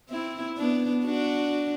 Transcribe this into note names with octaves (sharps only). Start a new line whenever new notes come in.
C4 E4
B3 D4
D4 F#4